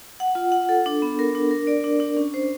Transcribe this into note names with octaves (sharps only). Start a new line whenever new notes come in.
F#5
F4
F#5
A4
D4
B3
A#4
D4
A#4
D5
D4
D4
C#4
C5